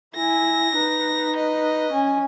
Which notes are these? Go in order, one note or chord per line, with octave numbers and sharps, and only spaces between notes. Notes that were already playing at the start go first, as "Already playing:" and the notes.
E4 G#5 A#6
D#4 B4
D#5
C#4 G#5